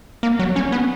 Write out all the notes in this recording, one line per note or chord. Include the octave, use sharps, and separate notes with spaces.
A#3
F#3
C#4
B3